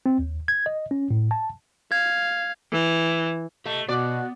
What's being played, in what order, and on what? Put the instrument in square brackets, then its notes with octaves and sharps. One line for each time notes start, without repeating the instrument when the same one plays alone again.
[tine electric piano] C4
D#2
G#6
D#5
C#4
A2
A5
[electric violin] F5 [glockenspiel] G#6
[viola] E3
[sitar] A3 [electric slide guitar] G4 D#5 A5
[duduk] B2 [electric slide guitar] B3 [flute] F#4 [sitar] D5